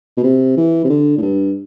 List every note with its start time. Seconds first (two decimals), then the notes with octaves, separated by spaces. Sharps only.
0.17 B2
0.23 C3
0.57 E3
0.84 C3
0.90 D3
1.18 A2
1.22 G2